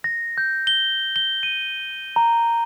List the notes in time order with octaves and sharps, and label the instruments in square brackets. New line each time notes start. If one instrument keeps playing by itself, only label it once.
[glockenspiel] A#6
G6
G7
G7
D#7
A#5